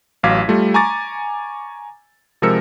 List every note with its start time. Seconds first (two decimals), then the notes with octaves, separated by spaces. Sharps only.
0.23 A1 F#3 F5 D6 G#6 B6
0.48 G3 A3 F4
0.74 G#5 A#5 C#6 D6 A6
2.42 C3 F3 G#3 A#4 E6 C#7